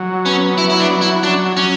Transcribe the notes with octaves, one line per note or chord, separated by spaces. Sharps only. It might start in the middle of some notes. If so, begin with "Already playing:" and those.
Already playing: F#3
B3 C#4
F#3 E4
E4
D4
F#3
E4
F#3 D4
F#3 C#4